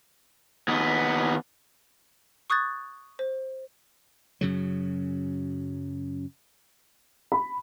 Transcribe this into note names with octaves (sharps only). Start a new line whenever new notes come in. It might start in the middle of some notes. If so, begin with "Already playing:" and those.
D#2 B3
C#6 D#6 F#6 G#6 A6
C5
F#2 C#3 F#3
B5